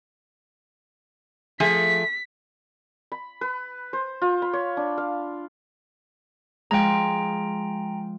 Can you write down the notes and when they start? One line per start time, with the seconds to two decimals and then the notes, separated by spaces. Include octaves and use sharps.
1.60 F3 A3 G#4 B6
3.12 B5
3.41 B4
3.93 C5
4.22 F4
4.42 B5
4.53 C#5
4.77 D4
4.98 F5
6.71 F3 G#3 G5 A#5